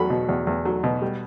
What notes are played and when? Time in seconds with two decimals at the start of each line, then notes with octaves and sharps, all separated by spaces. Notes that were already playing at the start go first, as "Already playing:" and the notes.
Already playing: E2 F#3 B5
0.10 B2
0.29 E2
0.47 E2
0.65 F#3
0.84 B2
1.02 G3